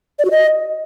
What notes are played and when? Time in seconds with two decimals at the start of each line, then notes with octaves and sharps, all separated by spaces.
0.19 D5
0.25 F#4
0.31 D#5